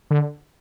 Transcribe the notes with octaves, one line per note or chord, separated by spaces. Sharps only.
D3